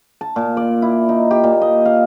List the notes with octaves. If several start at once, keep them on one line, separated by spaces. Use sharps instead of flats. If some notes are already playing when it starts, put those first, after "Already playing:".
A5
A#2
D5
E4
D#4
G4
A#2
D#5
F5